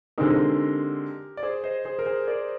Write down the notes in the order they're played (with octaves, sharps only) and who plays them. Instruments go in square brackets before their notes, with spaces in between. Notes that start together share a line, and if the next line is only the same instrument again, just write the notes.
[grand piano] D3 G#3 C4 D#4 [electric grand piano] G4 A#4
[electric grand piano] D5
G#4 C5
C5 D#5
G#4 C5
A#4
G#4 C5
A#4 D5